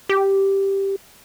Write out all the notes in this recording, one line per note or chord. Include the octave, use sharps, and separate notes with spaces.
G4